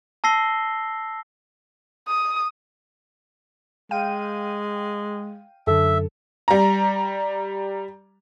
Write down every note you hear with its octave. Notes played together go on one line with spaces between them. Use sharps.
A5 E6 A#6 C7 G7
D#6
G#3 F5 G5 D#7
F#2 D3 A4 E5
G3 A#5